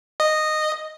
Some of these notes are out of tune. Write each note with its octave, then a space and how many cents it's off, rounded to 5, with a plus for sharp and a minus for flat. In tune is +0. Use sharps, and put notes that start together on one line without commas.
D#5 -10